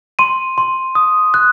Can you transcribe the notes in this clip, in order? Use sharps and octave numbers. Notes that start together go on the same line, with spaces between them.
C6 D#7
C6
D#6
F#6